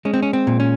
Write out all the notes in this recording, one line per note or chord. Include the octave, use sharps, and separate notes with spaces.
G#3 C#4
C4
C#4
C4
A#2
C#4